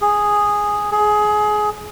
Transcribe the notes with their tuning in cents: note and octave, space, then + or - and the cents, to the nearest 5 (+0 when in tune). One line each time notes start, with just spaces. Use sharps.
G#4 -5
G#4 +20